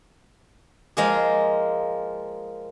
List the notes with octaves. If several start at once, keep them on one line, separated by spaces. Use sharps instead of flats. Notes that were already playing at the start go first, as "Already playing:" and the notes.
F3 G#3 A#3 G#4